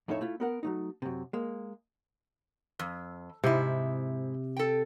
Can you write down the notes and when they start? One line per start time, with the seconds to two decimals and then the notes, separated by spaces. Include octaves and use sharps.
0.08 F2 A2 D#4 A4 C#5 E5
0.21 A3 E4 F4
0.40 B3 A#4 F#5
0.63 F#3 A3 D#4
1.02 F#2 C3
1.33 G#3 A#3
2.79 F2
3.44 G#2 C3 C4 E4
4.57 A4 G5